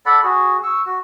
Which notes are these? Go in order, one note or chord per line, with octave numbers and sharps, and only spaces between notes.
A4 D5 F#5 B5
F#4 G#4
C#6 E6
F#4